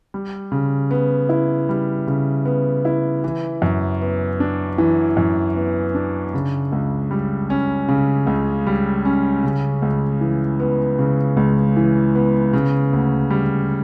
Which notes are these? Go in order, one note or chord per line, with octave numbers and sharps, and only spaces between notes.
G3
C#3
B3
E4
G3
C#3
B3
E4
E3
F#2
B3
D4
E3
F#2
B3
D4
C#3
C#2
G3
C#4
C#3
C#2
G3
C#4
C#3
C#2
E3
B3
C#3
C#2
E3
B3
C#3
D2
G3